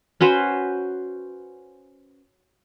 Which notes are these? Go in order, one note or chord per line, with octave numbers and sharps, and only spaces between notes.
C#4 F#4 B4 C5